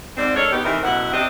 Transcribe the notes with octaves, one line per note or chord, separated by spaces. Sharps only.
G#2 C4 C5 D5
G#3 D4 A4 A#4 C#5
B3 D#4 G4
C3 E3 A3 C4 D#4 A#4
F#2 B2 A3 E4 F#5
C3 C4 D4 G4 D#5